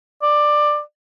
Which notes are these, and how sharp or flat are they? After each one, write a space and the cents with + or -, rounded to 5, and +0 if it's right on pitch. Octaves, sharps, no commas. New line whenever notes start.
D5 +15